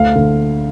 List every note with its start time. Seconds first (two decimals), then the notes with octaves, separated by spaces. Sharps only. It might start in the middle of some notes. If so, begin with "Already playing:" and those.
Already playing: D2 F5
0.15 D3